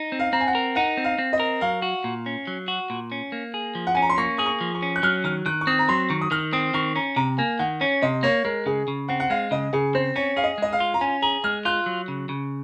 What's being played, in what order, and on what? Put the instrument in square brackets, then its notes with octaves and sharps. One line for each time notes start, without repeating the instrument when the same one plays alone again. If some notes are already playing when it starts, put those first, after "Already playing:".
Already playing: [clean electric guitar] D#4
C4
[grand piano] F5
[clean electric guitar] C4 [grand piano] A#5
[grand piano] G#5
F#5
[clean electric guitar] A#4
[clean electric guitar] D#4 [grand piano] F#5
[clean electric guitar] C4
[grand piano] F5
[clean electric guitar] C4
[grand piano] D#5
[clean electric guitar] A#4
[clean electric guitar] F#3 [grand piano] F5
[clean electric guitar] F#4
A#2
C#4
F#3
F#4
A#2
C#4
A#3
G#4
F3
[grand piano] F#5
[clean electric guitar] C#4 [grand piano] G#5
[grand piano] A#5
C6
[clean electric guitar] A#3 [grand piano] C#6
[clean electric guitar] G#4 [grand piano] D#6
[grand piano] C#6
[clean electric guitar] F3
[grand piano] C#6
[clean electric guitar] C#4
[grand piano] F#6
[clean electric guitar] F#3 [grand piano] F6
[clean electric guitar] D#3 [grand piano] F6
[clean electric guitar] D#3 [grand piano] F#6
[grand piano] C#6
[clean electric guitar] C4 [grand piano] D#6
[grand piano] A#5
[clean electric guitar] F#3 [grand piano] C6
[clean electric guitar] D#3 [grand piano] C#6
[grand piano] D#6
[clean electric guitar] D#3 [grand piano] F6
[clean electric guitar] C4 [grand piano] D#6
[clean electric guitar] D#3 [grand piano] C#6
[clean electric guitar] C#4 [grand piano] A#5
[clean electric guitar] C3 [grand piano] A#5
[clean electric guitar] A#3 [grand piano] G#5
[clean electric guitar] D#3 [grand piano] F#5
[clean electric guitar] C#4 [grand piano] C#5
[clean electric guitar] C3 [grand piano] D#5
[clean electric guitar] A#3 [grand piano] C#5
[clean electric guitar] G#3 [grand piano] A#4
[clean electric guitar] C#3 [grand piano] G#4
[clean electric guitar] C#3
[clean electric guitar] C4 [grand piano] F#5
[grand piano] F#5
[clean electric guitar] G#3 [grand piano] F5
[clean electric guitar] C#3 [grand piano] D#5
[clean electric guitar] C#3 [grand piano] G#4
[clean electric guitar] C4 [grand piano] C5
[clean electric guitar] C#4 [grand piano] C#5
[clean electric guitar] G#4 [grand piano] F5
[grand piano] D#5
[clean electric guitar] G#3 [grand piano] D#5
[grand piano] F5
[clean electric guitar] F4
[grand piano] A#5
[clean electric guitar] C#4 [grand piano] G#5
[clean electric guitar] G#4 [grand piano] A#5
[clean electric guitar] G#3 [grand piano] F6
[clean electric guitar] F4 [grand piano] F#6
[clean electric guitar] F#3
C#3
C#3